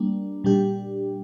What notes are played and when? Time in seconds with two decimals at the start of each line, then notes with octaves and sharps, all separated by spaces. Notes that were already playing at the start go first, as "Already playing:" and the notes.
Already playing: G3 A#3 D4
0.44 A#2 G3 D4 G4